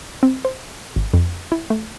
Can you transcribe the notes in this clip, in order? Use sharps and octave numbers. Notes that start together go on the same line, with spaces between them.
C4
C5
G#1
F2
E4
A3